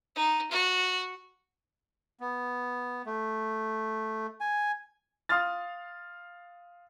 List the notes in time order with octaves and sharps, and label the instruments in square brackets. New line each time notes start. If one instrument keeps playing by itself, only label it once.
[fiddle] D#4
F#4
[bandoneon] B3
A3
G#5
[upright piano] F5 C6 D#6 F6 A6